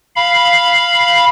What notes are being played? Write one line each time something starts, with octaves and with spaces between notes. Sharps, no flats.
F5 B5